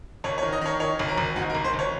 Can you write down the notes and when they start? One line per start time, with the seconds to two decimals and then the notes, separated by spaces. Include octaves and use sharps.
0.24 G#1 C#5
0.38 C#5
0.43 D#3
0.52 D#5
0.61 D#3 C#5
0.80 D#3 C#5
0.99 G#1
1.08 A#4
1.18 G#1
1.36 G#2 F#4
1.50 A#4
1.55 G#1
1.64 C5
1.74 G#1
1.79 C#5